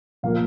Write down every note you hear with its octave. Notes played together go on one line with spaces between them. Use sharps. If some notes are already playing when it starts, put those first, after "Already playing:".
A#2 F3 A#3 F5